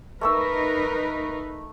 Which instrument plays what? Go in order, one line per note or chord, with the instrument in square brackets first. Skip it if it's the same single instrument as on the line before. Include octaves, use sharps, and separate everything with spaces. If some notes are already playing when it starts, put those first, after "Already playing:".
[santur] A3 C#6 E6 [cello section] D#4 A#4 B4